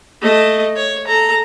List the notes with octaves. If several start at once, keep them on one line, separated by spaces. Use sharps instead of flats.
A3 D#5
C#5
A4 A#5